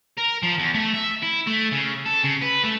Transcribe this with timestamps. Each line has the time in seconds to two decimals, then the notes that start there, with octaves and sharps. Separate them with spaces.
0.17 A#4
0.43 F3
0.59 E2
0.75 A3
0.94 E5
1.22 E4
1.47 A3
1.71 C#3
2.06 A4
2.23 C#3
2.42 B4
2.63 A3